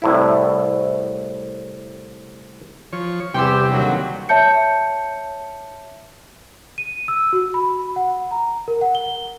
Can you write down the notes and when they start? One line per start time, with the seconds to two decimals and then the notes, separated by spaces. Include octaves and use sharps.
0.02 C2 A2 E4
2.93 F3 C#5
3.34 E2 C3 E3 G3 G4 G5 C6 E6
3.71 D#2 D3 F#3
4.29 C#5 E5 A5 G6 C#7
6.78 D#7
7.08 E6
7.33 F#4
7.54 B5
7.96 F#5
8.31 A#5
8.68 A#4
8.81 F#5
8.95 G7